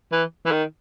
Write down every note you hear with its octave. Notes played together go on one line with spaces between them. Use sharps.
E3
E3
D#3